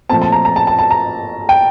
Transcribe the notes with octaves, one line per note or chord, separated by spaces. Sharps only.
A#2 F3 A3 C4 A5
A5
A#5
A#5
A5
A5
A5
A#5
G5